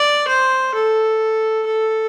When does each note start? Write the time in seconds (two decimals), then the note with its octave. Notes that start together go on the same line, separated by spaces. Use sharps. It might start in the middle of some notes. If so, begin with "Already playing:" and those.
Already playing: D5
0.28 C5
0.74 A4
1.66 A4